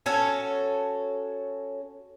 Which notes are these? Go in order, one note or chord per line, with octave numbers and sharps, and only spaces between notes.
C#4 F#4 A4 C#5